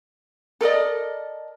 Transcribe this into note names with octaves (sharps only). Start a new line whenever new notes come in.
A4 A#4 D5 D#5